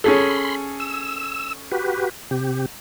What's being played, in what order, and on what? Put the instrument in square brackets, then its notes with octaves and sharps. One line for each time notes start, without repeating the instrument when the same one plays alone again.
[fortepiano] C#4 G#4 A4 [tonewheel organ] B5 C6
[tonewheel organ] E6
F#4 G4 B4
C3 G4